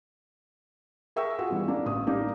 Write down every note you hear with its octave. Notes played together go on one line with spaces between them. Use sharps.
G#4 A#4 E5 G5 C#6 E6
F4 F#4 G#4
E3 G3 B3
A#3 D4
A1 D#6
A#3 D4 D#4 G4 A#4